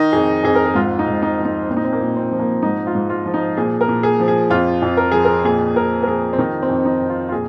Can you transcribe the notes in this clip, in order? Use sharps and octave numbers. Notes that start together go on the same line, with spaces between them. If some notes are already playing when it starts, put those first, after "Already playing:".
Already playing: D#3 D#4
F2 G#4
F2 G#4
A#4
G#4
G#2 F4
D#4
G#2
D#4
F3
D#4
A#2 C4
D#4
C4
A#3
A#2
C4
F3
A#3
G#2 D#4
F4
G#2
F4
F3
D#4
A#2 G#4
A#4
A#2
G#4
F3
G#4
F2 F4
F2
A#4
F3 G#4
A#4
A#2 G#4
A#2 A#4
A#4
F3 G#4
C4
D#3 D#4
C4
F2
D#4
F2
F4
F4
A#2 G#4